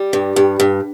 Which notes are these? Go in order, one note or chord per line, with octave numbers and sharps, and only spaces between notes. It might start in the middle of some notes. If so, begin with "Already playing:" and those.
Already playing: G3
G2
G2
G2